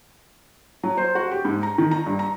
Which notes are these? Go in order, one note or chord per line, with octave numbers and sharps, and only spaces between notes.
F#3
C5
F#4
G4
G#2
A#5
D#3
A#5
G2
A#5